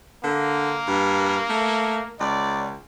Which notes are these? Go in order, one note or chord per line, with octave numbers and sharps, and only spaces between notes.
D3 A#3
G2
A3
C#2 D5